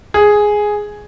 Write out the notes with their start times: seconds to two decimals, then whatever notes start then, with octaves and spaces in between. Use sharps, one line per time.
0.14 G#4